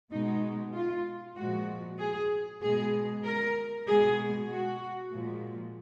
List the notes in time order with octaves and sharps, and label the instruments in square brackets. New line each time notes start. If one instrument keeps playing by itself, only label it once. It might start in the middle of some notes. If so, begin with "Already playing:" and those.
[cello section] B2 G#3 D#4
F4
A#2 F3 G#3 F#4
G#4
B2 G#3 G#4
A#4
B2 G#3 G#4
F#4
A#2 F3 G#3